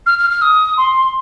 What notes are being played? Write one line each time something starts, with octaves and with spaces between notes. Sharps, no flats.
F6
F6
F6
D#6
C6